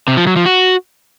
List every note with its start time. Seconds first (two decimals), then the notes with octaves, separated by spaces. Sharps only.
0.08 C3
0.17 F3
0.27 F#3
0.36 F3
0.46 F#4